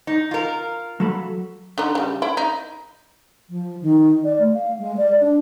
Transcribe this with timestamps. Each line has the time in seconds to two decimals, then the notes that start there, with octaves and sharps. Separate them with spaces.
0.07 D#4
0.31 F4 A#4
1.00 F#3 A4 B5
1.78 D3 D#4
1.95 C#3 G3
2.22 E4
2.37 D#4
3.49 F3
3.82 D#3
4.24 D5
4.39 A3
4.54 F5
4.79 G#3
4.97 D5
5.21 D4